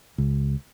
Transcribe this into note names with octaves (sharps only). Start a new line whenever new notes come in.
C#2